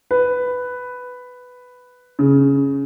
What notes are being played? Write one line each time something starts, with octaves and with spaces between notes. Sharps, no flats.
B4
C#3